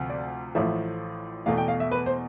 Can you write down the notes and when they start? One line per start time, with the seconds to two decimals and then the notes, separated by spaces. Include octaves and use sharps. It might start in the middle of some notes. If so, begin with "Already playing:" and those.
Already playing: D2 C3 F3
0.10 D5
0.55 A1 A2 F3 A3 E5
1.46 E2 B2 A3 F5
1.57 G5
1.68 F5
1.80 E5
1.91 B4
2.06 C5